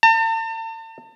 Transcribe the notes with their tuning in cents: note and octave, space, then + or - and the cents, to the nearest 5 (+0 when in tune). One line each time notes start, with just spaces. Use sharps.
A5 +40